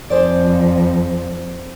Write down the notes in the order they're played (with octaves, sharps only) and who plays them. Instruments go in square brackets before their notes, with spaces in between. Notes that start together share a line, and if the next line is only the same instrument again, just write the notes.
[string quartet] F2 [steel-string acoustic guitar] G#4 C5 D5